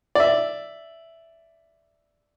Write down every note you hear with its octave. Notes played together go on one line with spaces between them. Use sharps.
D5 E5